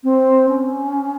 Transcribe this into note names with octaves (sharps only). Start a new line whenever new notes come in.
C4
C#4